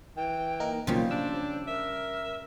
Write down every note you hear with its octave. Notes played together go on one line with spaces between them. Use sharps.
E3 G5
A#3 D#4 A#4
B1 F#2 A#2 C#3 F3 G3 C5
D4 E6
A#4 E5